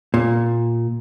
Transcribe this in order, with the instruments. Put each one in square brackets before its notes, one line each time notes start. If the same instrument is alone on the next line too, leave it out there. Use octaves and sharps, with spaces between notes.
[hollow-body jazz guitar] A#2